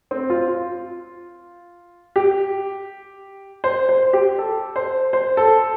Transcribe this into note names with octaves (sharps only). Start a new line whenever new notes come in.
C4
F4
F4
G4
C5
C5
G4
A4
C5
C5
A4